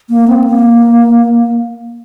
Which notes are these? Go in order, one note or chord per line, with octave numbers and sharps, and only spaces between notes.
A#3
C4
A#3